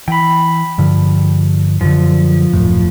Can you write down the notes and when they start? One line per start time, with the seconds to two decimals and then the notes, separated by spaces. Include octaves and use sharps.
0.08 E3 G5 B5
0.78 G2 D3 F3
1.81 F#2 D3 F3
2.53 D#1 F#2 A2